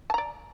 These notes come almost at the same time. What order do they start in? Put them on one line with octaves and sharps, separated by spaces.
A5 A#5 D5